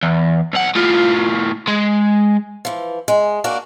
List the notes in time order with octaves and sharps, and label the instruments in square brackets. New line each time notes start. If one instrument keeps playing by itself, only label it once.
[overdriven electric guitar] E2
B1 F#5
A2 F4
G#3
[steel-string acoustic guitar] E3 F3
G#3
A#3 D4 F#4